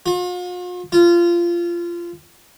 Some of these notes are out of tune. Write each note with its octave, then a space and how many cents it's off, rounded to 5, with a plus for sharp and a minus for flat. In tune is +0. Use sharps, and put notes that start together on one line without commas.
F4 +45
F4 -20